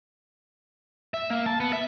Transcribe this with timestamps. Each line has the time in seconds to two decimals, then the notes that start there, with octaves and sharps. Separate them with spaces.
1.14 E5
1.30 A#3
1.46 A5
1.60 B3
1.73 E5